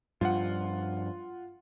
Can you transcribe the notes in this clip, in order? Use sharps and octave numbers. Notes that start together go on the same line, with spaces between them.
G2 F3 F4 F#5